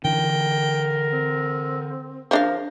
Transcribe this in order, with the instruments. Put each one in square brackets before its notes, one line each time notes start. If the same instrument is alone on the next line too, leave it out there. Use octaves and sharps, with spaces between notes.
[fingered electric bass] D3 E3 [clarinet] A#4 [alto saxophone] G5
[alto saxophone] C4
[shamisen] F3 D4 F5 [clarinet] A#4